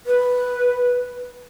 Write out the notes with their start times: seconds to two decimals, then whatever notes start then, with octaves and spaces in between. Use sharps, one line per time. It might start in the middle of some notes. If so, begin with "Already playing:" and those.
0.06 B4